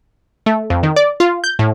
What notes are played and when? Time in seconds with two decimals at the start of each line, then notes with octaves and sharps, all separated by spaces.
0.46 A3
0.70 F2
0.83 D#3
0.96 D5
1.20 F4
1.44 G6
1.59 A2